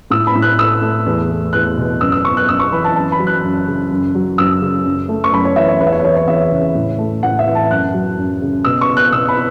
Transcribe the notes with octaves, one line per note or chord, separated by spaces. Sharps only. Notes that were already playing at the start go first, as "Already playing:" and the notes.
A2 E6
B5
A2
F#6
A3 E6
A3
E2
A3
E2 F#6
B2
F#2 E6
E6
B3 C#6
F#6
F#2 E6
C#6
E3 B5
A5
F#2 A5
B5
F#3
F#6
F#2
C#3
F#2
F#3
F#2 E6
C#3
F#2
A3
C#6
F#2 B5
C#5
E3 E5
C#5
E2 B4
E5
C#5
B4
E3 C#5
C#5
E2 E5
C#3
A2
A3
A2 F#5
E5
E3
A5
F#2 F#6
F#3
F#2
C#3
B2 E6
C#6
B3
F#6
B2 E6
B5